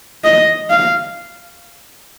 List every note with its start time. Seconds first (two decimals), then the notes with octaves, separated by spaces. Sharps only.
0.24 D#5
0.70 F5